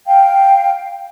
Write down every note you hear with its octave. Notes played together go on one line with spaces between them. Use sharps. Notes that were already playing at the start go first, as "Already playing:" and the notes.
F5 G5